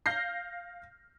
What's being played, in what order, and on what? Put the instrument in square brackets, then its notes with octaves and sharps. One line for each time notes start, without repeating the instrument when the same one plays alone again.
[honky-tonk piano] F5 F6 G6 A#6 C7